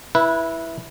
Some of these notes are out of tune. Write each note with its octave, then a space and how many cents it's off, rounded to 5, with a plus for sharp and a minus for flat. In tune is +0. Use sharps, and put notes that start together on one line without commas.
E4 +0 B4 -20